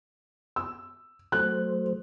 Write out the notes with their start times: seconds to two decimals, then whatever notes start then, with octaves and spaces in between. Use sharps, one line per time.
0.56 E6
1.32 F#3 A3 C5 F#6